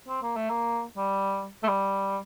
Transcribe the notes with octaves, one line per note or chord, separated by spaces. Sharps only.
C4
A#3
A3
A#3
G3
A3
G3